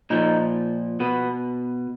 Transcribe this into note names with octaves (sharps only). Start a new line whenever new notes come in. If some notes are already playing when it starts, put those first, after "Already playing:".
A#2 F3 D#4
B2 B3